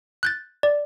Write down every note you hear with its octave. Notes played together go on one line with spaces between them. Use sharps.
F#6 G6 A6
D5